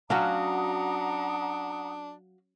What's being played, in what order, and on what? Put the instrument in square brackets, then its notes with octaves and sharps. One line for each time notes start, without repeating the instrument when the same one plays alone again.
[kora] F#3 C#4 [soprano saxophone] D4 [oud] F#4 F5 [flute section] F#5 A#5 D#6